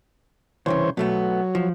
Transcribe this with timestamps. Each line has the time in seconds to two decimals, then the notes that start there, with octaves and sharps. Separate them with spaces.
0.66 C2 G2 C#3 E3 C5 C#5
0.97 B2 F#3 A3 B3
1.55 F3